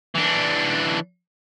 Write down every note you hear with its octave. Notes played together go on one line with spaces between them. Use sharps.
E3 D4